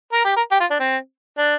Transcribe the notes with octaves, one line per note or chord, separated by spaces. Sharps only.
A#4
G4
A#4
G4
F4
D4
C4
D4